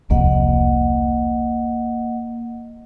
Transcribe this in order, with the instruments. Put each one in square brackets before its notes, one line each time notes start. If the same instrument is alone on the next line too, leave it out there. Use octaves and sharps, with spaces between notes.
[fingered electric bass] E1 C2 F2 [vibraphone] A#3 D#5 F#5